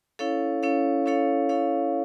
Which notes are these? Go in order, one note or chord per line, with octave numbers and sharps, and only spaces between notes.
C#4 E4 A4 C#5 F5
C#4 E4 A4 C#5 F5
C#4 E4 A4 C#5 F5
C#4 E4 A4 C#5 F5